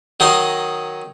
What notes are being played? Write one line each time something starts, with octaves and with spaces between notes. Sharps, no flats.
D#3 F#3 D#4 D#5 C6